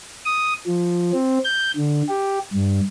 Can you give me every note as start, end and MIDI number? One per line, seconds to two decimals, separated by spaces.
0.25 0.53 87
0.67 1.12 53
1.12 1.39 60
1.44 1.71 91
1.76 2.02 50
2.09 2.39 67
2.54 2.80 43